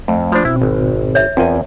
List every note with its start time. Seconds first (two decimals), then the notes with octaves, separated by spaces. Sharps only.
0.08 F2 A3
0.32 F3 D4 C5 B5
0.45 B2 C4 E4
0.62 G#1
1.15 C#5 E5
1.37 E2 C4 F4 A#4 G#5